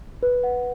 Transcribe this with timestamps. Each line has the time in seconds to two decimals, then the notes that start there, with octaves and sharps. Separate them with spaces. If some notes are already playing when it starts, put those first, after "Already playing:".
0.23 B4
0.44 F#5